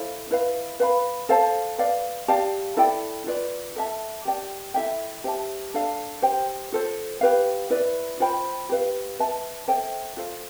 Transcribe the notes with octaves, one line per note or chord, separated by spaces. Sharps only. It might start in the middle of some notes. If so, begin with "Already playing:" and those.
Already playing: E4 A4 C5 F5
E4 B4 F5
B4 F5 B5
A4 C5 F5 A5
B4 D5 F5
G4 D5 F5 A5
E4 A4 D5 G5
F4 B4 D5
A4 E5 A5
G4 D5 G5
E4 A4 E5 G5
G4 C5 E5 A5
D4 A4 D5 F5
G4 C5 G5
F4 A4 C5
G4 B4 F5
E4 B4 D5
F4 C5 G5 B5
G4 B4 F5
B4 E5 A5
A4 C5 E5 G5
F4 A4 C5 F5